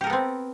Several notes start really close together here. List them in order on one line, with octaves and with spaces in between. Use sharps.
G4 A#4 A4 B3 C4